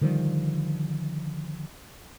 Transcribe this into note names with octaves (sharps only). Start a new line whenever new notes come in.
D3 D#3 F3 G3